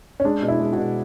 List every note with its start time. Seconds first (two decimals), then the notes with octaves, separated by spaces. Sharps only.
0.20 C#4
0.25 G#3 D4
0.42 B2
0.48 E4
0.60 G#3
0.73 F#4
0.78 B2